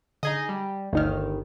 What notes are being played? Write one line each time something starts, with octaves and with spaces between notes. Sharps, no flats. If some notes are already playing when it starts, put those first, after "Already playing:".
D3 D#4 G#4 D#5
G3
G1 D2 D#3 D#4 F6